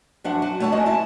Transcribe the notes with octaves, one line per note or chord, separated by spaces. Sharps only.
F#2 F3 D4 E5 F#5
F#3
A3 C#5 A5
G#3 C#4 F#4 D#5
E4 E5 A5